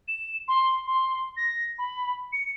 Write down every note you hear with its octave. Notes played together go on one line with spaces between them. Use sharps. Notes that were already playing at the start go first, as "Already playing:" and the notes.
E7
C6
C6
A#6
B5
C#7